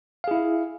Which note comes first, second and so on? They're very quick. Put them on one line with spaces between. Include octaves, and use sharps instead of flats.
F5 G#4 E4